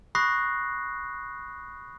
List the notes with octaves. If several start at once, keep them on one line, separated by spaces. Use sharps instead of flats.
B5 C#6 D#6 F#6 A#6 C7